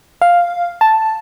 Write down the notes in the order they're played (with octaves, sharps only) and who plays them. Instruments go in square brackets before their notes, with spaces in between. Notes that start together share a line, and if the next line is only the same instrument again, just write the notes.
[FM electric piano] F5
A5